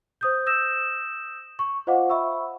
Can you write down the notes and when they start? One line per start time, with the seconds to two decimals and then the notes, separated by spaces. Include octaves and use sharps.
0.21 C5 D#6 G6
0.46 D#6 E6 G6 A#6 E7
1.59 C#6
1.87 F4 C5 D#5 F5 F#5 D6
2.10 E5 B5 C#6 E6